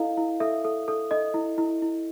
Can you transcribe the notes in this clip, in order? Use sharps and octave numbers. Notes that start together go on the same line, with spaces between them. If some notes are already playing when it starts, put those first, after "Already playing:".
Already playing: E4 A4 D#5 F5
E4
A4 E5
A4
A4
A4 D#5
E4
E4
E4